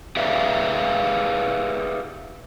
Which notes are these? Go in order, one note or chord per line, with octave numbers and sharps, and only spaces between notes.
G4 G#4 B4 D5 E5 F5